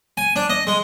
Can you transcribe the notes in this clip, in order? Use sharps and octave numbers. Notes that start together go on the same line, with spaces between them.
G#5
D4
D#5
G#3